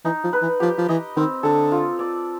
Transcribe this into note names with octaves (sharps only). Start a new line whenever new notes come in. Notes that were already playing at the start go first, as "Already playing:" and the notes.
E3 D#4
F3
B4
E3
F3 G4
F3
E3 D#5
D#3 C4
D3 A4
F4
D5